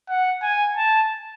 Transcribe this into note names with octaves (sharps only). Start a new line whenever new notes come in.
F#5
G#5
A5